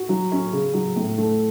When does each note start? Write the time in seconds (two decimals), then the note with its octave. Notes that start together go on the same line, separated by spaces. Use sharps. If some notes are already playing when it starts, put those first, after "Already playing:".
Already playing: F#4
0.09 F#3
0.32 C#4
0.53 C#3
0.74 F#3
0.96 A2
1.18 A3